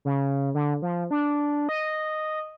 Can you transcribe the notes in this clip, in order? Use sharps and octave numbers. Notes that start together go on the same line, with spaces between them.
C#3
D3
F3
D4
D#5